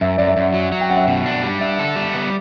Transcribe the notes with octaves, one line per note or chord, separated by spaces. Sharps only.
F#2 E5
F#2 D5
E5
F#2
F#3
F#3
G5
F#2 F#5
E5
B2 F#5
D4
G3
D4 E5
A4
G3
B3